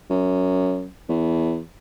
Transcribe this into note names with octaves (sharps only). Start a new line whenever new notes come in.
F#2
E2